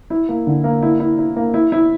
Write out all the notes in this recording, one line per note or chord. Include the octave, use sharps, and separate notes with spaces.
E4
A#3
D3
A#3
E4
E4
E4
A#3
E4
E4